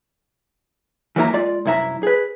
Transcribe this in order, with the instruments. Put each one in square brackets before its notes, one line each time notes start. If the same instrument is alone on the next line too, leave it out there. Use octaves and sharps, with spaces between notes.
[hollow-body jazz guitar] E3 F#3 A#3 E4 A#5
G#3 F4 D5
C2 F#2 E4 E5 A#5
G#4 B4